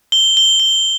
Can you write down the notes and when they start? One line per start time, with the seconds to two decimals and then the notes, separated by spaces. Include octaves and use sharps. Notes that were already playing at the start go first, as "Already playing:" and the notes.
0.12 G7
0.37 G7
0.60 G7